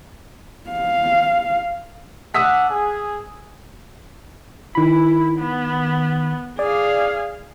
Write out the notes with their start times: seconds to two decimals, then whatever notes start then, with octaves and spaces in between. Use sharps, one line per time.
0.70 F5
2.34 D4 F#5 D#6 E6 B6
2.70 G#4
4.75 D#3 E4 B5
5.39 B3
6.59 G#4 D5 F5